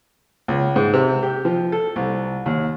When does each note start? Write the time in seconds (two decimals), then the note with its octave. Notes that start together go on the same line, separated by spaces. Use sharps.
0.48 C#2
0.76 G#2
0.93 C3
1.23 G4
1.45 F3
1.72 A4
1.96 C2
2.46 D#2